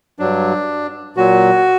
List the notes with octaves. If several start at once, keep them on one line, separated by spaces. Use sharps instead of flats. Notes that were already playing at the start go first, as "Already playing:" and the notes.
G2 F#3 D4
A#2 F#3 F#4